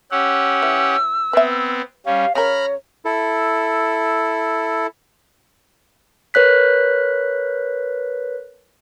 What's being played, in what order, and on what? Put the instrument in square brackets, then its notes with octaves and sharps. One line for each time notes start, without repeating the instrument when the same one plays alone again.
[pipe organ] C#4 G4 F#5 [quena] E6
[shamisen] E3
[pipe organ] B3 C4 [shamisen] B4 E5
[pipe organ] G3 C#4 [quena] F5
[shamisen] C#3 A#4 [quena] C#5 [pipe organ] A#5 B5 F6
[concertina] E4 A4
[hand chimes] A#4 B4 C#5 F#6 B6